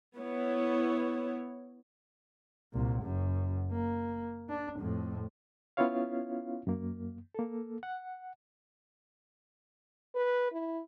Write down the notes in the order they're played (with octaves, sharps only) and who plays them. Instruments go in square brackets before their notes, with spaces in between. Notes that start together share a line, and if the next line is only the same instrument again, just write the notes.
[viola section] B3 E4 C#5
[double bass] C2 A#2
F#1 F#2
A#3
D4
F2 A2
[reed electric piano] B3 C#4 E4 F4 C#5 F5
F#2 A#3
A#3 A4
F#5
[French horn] B4
E4